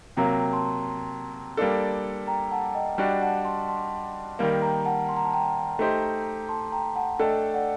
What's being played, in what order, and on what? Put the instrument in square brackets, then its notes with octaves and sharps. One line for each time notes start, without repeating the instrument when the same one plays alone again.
[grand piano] C3 F#3 A#3 [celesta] G5 A#5
[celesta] A5 C6
[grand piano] G3 A#3 D4 A4
[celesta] G5 A#5
F#5 A5
D#5 G5
[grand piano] G3 D4 F#4 [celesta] D#5 G5
[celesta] F#5 A5
A5 C6
A5 C6
[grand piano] D#3 G3 A#3
[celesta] G5 A#5
F#5 A5
C6
A#5
A5
G5 A#5
[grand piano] A3 D#4 G4 C5
[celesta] A5 C6
G5 A#5
F#5 A5
[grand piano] A3 D4 A4 [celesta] D#5 G5
[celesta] D5 F#5